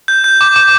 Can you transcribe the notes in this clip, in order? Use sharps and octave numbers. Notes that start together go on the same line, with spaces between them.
G6
G6
D6
D6